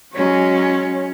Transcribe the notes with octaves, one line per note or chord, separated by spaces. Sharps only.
F#3 G#3 C#4 C#5